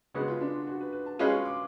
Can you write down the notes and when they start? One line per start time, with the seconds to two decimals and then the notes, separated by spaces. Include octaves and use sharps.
0.14 C#3 G#3 B3 F#4
0.28 F4
0.41 D4
0.54 F4
0.67 F#4
0.81 B4
0.93 B4
1.06 A5
1.19 G#3 C#4 F4 G#4 B4 G#5
1.32 C#6
1.45 D6